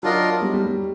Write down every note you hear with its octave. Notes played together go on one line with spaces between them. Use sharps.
F#3 D4 F4 A#4 D#5
G3
G3
G3